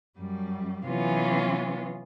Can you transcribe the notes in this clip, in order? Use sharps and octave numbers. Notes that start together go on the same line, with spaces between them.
F#2 G3
C3 E3 F#3 B3 C#4 F4